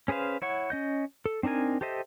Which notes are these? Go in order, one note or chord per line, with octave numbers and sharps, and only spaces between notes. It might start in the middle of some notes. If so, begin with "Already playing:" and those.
C#4 G#4 B4 C5 F5
E4 C#5 F#5 C#6
C#4 D#5 G6
A4
C4 D4 D#4 A#4 G#5
G4 A4 C5 D#5 E5